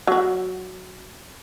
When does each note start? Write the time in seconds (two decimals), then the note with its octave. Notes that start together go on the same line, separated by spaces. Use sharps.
0.07 F#3 F#4